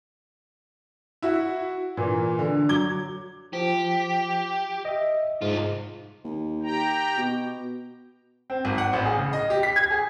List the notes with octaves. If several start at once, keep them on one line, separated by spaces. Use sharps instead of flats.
E4 F#4 E5
A#2 E3
D3
F#3 D6 G#6 G7
F3 G4
D#5 E5
C2 G#2 G#3 F4
D#2
G4 G5 A#5
B2
C4
G#1
F#5
A1
G#4
C#3
D#5
G4
B6
G#6
G#4